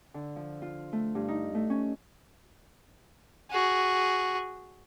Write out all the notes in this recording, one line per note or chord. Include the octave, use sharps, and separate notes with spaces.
D3
F3
F4
A3
G2
D#4
A3
C#4
F#4 G#4